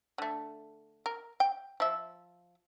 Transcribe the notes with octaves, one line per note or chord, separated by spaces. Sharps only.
D3 A3
A#4
G5
F3 E5